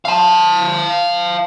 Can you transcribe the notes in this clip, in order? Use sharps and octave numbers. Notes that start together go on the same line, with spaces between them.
F5 A5